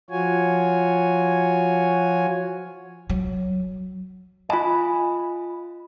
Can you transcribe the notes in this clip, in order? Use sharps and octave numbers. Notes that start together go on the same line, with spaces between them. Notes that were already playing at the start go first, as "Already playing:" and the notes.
F3 F4 F#4 C#5 G#5
F#3
F4 D#5 G#5 B5